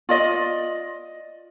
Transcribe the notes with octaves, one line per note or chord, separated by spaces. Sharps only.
F4 D5 D#5